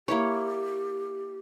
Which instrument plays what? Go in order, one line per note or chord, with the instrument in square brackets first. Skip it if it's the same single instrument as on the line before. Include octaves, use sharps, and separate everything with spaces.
[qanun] A#3 E4 C#5 [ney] G4